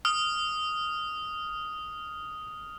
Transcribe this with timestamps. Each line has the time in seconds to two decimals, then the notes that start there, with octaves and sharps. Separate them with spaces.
0.05 D#6 F6